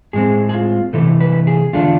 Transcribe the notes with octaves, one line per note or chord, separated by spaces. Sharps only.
A2 G#3 C4 G#4
G#4
F4
C3 E3 A3 A4
B4
G#4
E2 D3 A3 D4 F4